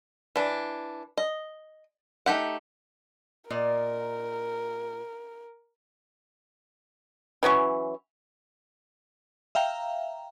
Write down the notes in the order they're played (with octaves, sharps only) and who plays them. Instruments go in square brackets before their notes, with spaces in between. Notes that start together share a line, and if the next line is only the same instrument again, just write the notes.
[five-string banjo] E3 D4
D#5
A3 D#4 G4 F#5
[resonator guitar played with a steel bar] A#2 D5 D#5 [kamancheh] A#4
[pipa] E3 F#3 C#4 C#6
[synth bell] E5 F5 G5 A#5